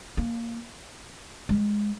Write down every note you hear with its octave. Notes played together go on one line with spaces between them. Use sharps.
A#3
G#3